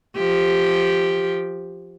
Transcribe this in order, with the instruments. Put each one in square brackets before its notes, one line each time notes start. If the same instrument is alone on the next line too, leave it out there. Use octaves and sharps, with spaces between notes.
[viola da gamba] F3 G4